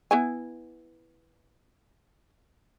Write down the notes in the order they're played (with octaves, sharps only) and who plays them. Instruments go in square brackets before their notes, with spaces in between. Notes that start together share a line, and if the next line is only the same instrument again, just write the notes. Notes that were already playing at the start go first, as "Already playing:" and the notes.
[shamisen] B3 E4 G#5